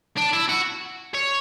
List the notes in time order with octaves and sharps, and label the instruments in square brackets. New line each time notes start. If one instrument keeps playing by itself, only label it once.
[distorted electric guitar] D4
E4
F#4
C#5